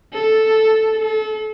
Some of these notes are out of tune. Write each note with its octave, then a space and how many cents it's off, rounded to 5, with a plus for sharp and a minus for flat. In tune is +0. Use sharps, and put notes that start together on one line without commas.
A4 +0
A4 -30